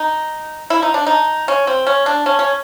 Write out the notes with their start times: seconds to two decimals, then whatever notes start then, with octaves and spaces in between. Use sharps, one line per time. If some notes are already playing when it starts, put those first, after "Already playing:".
Already playing: D#4
0.70 E4
0.82 D#4
0.94 D4
1.06 D#4
1.48 C#4
1.67 C4
1.87 C#4
2.06 D4
2.26 C#4
2.39 C#4